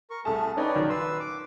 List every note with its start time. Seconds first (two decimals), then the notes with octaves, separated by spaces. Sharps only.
0.10 A#4 C#6
0.25 C2 A3 G#4 A4 A5
0.57 C#4 D#4 B4 C#5 D5 G5
0.75 A#1 D#3 F#3
0.90 B4 C6 E6
1.20 D6